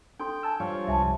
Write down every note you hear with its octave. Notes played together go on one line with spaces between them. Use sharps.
D4 A4 G5 C6
G#5 A5 E6
G2 F3 C#5 F5
C2 G3 E5 G#5 A5